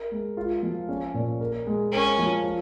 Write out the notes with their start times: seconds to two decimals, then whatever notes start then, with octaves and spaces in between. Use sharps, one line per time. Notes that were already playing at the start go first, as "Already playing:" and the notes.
Already playing: A#4
0.11 G#3
0.37 F4
0.63 F3
0.89 C#4
1.14 A#2
1.40 A#4
1.67 G#3
1.92 C#4 A#4
2.18 F3
2.44 F4